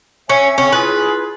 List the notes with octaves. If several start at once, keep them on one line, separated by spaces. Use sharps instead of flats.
C#4 C#5 E5 G#5
C#3 C4 C#4 C#6
E4 F4 G#4 B4